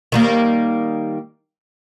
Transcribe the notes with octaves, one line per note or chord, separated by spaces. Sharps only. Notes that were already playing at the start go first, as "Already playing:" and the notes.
D#3 G3 A#3